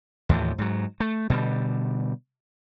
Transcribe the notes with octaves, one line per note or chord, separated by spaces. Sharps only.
D#2 A2 E3 F3
G#2 F#3
A3
B2 D3 F#3 G3